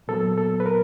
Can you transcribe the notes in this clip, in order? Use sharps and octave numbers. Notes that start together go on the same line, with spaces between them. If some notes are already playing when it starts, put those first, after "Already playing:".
A#2 F#3 B3 A4
A4
B4
A#4